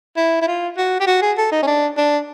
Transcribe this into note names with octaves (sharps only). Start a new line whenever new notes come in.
E4
E4
F4
F#4
G4
F#4
G#4
A4
D#4
C#4
D4
D4